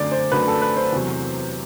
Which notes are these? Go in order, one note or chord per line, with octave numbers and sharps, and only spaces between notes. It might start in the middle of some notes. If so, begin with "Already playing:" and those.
Already playing: F#2 D3 A3 C4 C5 D5
C5
F#2 D3 A3 C4 B4
A4
B4
C5
E2 C3 F#3